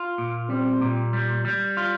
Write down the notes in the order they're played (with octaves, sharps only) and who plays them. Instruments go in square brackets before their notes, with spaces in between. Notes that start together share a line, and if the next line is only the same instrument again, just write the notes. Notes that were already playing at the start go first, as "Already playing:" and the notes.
Already playing: [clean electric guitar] F4
A#2
[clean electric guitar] G3 [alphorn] C4
[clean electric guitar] A#2
G3
G3
F4